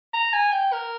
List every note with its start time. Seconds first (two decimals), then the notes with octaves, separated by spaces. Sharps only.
0.13 A#5
0.33 G#5
0.52 G5
0.73 A#4